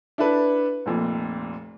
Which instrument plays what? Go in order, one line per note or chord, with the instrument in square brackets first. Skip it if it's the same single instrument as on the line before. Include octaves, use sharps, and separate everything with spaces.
[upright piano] D4 E4 A4 B4
F1 F2 A#2